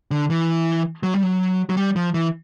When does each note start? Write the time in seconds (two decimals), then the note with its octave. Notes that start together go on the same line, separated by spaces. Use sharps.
0.11 D3
0.30 E3
1.03 F#3
1.14 G3
1.23 F#3
1.70 F#3
1.77 G3
1.96 F3
2.14 E3